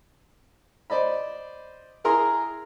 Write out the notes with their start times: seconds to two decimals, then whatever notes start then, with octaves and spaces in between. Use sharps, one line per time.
0.90 C5 D5 D#5 B5
2.04 E4 G#4 A#4 A#5 C6